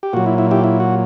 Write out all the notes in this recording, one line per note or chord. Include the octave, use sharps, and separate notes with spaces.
G4
A#2 F#3 F#4
E4
E4
E4 G4
E4
F#4